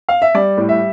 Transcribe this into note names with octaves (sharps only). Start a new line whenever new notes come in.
F5
E5
G3 D5
A2
E5